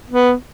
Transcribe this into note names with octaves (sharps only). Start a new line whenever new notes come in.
B3